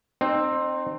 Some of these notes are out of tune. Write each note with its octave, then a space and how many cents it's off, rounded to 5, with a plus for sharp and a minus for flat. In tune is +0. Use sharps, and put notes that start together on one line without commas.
C4 +10 D#4 -30